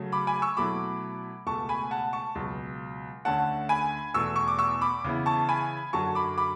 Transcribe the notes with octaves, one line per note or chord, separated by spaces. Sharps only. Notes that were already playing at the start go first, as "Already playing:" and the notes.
Already playing: C#3 F#3 A3
B5 D6
G#5 B5
C#6 E6
B2 F#3 A3 E4 B5 D6
C#2 B2 A3 A5 C#6
G#5 B5
F#5 A5
A5 C#6
C#2 B2 F#3
D2 D3 A3 C#4 F#5 A5
G#5 B5
E2 B2 A3 C#6 E6
C#6
D6
C#6 E6
B5 D6
C#3 E3 B3 E4
A5 C#6
G#5 B5
F#2 D3 F#3 A5 C#6
B5 D6
B5 D6